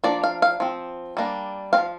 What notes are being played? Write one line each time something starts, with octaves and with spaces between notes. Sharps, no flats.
F3 A#3 D4 D5
F5
F5
F3 C4
G3 A#3 D4
F3 C4 F5